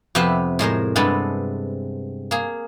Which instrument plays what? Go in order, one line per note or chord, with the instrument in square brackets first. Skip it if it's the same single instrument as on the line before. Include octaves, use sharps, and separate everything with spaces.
[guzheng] F2 C3 B3 G4 E5
A2 G#3 A#4 C5
G2 C3 G#3 B3 C4 A4
A#3 G#4